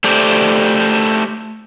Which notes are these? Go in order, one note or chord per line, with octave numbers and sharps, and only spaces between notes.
A3 G4 C5 D5